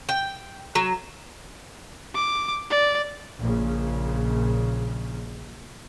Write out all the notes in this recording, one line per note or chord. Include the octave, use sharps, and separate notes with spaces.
G5
F#3
D6
D5
A#1 A#2 C#3